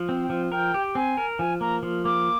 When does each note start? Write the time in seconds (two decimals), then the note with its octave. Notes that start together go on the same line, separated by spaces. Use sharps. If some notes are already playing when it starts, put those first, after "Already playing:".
Already playing: F3
0.09 C4
0.22 G5
0.30 F3
0.52 A#4 G5
0.74 G4
0.95 C4 G#5
1.17 A#4
1.39 F3 G#5
1.61 A#3 A#5
1.83 F3
2.05 A#3 D6